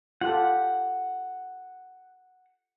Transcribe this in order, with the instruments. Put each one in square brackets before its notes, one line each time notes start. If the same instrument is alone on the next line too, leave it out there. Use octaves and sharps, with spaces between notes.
[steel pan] F4 G4 A4 [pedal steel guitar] F#5